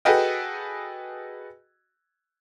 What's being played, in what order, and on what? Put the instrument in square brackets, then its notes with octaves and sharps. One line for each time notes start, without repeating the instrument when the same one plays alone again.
[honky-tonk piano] F#4 G#4 A4 B4 D#5 G5